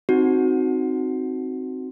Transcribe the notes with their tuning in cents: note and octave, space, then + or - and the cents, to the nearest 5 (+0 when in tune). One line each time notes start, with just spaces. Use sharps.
C4 +0 D#4 +0 F#4 +0